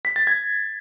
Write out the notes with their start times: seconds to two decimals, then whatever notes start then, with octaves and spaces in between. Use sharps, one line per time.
0.05 B6
0.16 A6
0.27 G#6